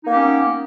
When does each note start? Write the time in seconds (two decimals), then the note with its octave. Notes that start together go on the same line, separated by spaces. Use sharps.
0.03 D#4
0.07 A#3
0.10 G4
0.14 C#4
0.18 B3